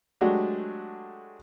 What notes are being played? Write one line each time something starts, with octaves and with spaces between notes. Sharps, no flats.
F#3 G#3 A3 D4 F#4 G4